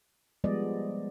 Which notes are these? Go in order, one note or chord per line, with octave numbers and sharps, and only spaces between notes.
F3 G3 G#3 B3 D5 D#5